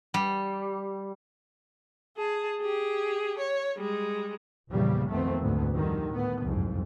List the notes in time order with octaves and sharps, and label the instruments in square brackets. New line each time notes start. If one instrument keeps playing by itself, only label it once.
[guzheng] G3
[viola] G#4 A5
G4 G#4
C#5
G3 G#3
[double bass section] F1 A#1 E2 C#3 G3 A#3
B1 F2 D#3 A3 B3 C4
D2 G#2 B3
F2 D3 D#3 G3
A2 B3
F#1 C2 F2 G#2